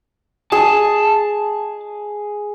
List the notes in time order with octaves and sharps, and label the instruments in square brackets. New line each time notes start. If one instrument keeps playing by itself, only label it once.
[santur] G#4 [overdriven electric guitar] A5